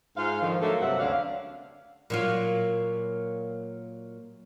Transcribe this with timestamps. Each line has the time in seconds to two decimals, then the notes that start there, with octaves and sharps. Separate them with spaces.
0.17 G#2 F4 C5 F5
0.42 G#2 D3 D#3 F3
0.61 D3 F#3 A3 A#3 A4
0.81 G2 C3 F#3 C4 E5 F#5
1.00 D2 D3 C#4 D4 F5
2.10 A#2 F#3 F4